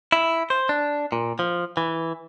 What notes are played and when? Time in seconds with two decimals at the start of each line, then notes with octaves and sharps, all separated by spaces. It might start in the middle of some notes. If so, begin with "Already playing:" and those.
0.12 E4
0.50 C5
0.69 D4
1.12 A#2
1.39 F3
1.77 E3